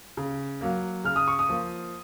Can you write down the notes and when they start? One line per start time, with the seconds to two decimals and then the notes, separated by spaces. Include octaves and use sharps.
0.17 C#3
0.61 F#3 A#3
1.04 C#3 F6
1.16 D#6
1.28 C#6
1.39 D#6
1.49 F3 A#3